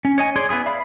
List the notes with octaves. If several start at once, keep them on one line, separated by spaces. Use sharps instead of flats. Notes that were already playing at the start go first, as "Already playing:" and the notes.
C#4
C#5 D#5 G#5
G#4 C#5 D5 C6
B3 E4 G#4 D#6
D5 E5 F5 B5